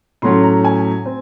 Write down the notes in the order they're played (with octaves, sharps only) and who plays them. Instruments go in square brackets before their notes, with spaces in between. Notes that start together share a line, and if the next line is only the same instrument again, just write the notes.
[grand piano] A2 F#3 A3 C#4 C6
A#5
G#5
C4